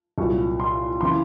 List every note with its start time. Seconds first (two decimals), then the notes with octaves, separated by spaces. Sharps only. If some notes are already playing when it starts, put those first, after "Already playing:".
0.18 C2 A#2 F#3 C#6
0.60 C6
1.01 C#3 E3 C6
1.09 B5